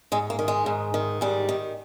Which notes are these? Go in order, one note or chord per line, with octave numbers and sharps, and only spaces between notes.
G#2 G#3
A#3
D#3
G#3
G#2
D#3
G#2 G3
D#3